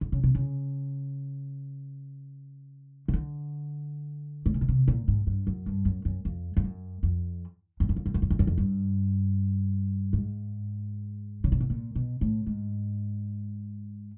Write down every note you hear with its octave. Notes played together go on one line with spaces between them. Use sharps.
D3
C#3
C3
C#3
C#3
D3
A2
A#2
B2
C3
A#2
G#2
G2
F#2
G2
F#2
F#2
F2
F2
F#2
F2
F2
F#2
F2
F#2
F2
F#2
F2
F#2
F2
G2
G#2
C#3
C3
B2
A#2
B2
A2
G#2